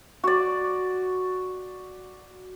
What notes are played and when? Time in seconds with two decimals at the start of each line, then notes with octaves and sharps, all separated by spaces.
0.24 F#4 D5